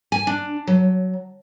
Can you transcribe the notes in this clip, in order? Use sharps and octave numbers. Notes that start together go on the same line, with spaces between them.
G#5
D4
F#3